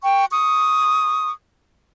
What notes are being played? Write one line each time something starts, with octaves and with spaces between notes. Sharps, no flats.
G5 C#6
C#6 D#6